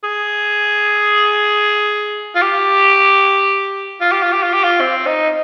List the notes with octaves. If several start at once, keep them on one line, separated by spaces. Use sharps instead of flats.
G#4
F4
G4
F4
G4
F4
G4
F4
G4
F4
C4
D#4